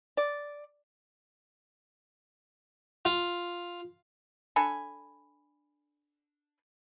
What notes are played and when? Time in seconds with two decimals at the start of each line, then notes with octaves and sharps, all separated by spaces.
0.17 D5
3.05 F4
4.56 D4 A4 G#5 B5